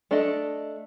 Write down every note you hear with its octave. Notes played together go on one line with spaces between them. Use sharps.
A3 D4 A4 D#5